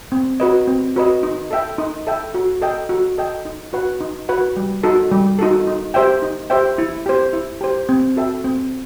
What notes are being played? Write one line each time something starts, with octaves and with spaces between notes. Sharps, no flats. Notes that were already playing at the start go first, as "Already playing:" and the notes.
C4
F#4 B4 D#5
C4
F#4 B4 D#5
D#4
A4 E5 G5
D#4
A4 E5 G5
F#4
A4 D#5 G5
F#4
A4 D#5 G5
D#4
F#4 B4 F#5
D#4
F#4 B4 F#5
G3
D#4 F#4 A4
G3
D#4 F#4 A4
D#4
G4 C5 E5 G5
D#4
G4 C5 E5 G5
E4
G4 C5
E4
G4 C5
C4
F#4 A4 E5 G5
C4